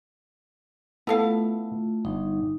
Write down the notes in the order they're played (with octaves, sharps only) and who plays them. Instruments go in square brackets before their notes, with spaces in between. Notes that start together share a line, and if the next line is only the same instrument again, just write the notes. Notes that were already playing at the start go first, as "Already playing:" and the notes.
[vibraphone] A3 F4 [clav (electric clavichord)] B3 [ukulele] E4 A4 F5
[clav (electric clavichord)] G1 [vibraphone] D#4